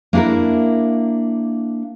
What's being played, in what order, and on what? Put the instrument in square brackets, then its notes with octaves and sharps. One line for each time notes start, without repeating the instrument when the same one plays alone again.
[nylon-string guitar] A#3 D4 E4 F#4 A#4